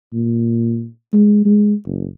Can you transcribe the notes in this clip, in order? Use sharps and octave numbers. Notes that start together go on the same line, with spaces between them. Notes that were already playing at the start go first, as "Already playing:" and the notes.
A#2
G#3
G#3
F#1